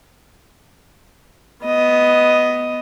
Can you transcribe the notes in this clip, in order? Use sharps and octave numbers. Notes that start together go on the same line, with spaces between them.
B3 D#5